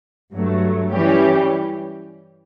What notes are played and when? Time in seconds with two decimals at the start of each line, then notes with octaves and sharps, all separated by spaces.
0.33 G2 F#3 A3
0.92 E3 G3 C#4 G4